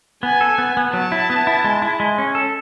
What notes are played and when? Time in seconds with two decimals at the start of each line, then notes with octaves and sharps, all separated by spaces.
0.23 B3 G#5
0.41 A4
0.58 B3
0.77 B3
0.93 F#3 A5
1.12 E4
1.30 B3
1.47 E4
1.64 G#3
1.82 E4
2.00 G#3
2.18 C#4
2.35 A4